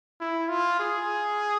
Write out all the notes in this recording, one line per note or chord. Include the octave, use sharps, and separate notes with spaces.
E4
F4
G#4